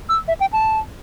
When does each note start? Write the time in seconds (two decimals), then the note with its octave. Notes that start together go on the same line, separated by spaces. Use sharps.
0.09 E6
0.28 E5
0.41 G5
0.53 A5